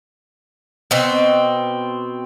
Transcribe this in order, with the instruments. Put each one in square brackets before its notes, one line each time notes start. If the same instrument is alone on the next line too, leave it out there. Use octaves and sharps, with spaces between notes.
[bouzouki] B2 C4